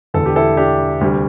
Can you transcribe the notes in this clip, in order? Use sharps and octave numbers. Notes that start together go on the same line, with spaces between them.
E1 E2 D3 A4
G4
E4 A4
D4 G4
D2 C3 G3